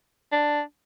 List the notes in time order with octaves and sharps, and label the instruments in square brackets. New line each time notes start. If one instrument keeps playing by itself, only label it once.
[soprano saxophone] D4